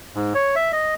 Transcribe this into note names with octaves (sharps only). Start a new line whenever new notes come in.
G#2
C#5
E5
D#5